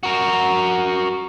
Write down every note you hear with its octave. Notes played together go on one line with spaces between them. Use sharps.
F#4 A#4